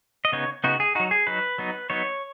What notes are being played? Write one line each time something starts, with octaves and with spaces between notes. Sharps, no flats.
D#5
C#3 B3 D#4 C#5
C#3 B3 D#4 F#4
G#4
F#3 D#4 F#4
G#4
F#3 D#4 B4
F#3 B3 D#4
F#3 B3 D#4 C#5